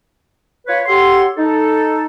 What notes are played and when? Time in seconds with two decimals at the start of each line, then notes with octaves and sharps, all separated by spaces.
0.67 F4 B4 C#5
0.86 F#4 G4 A4 C#5 F#5 C6
1.37 D#4 A4